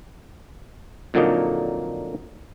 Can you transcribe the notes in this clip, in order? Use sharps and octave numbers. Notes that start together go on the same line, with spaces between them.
F2 A#2 D3 F#3 A#3 D#4